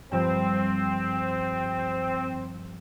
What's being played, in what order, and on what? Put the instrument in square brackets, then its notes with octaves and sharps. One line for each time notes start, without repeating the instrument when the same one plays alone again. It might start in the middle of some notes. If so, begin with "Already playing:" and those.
[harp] G2 F3 [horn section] C4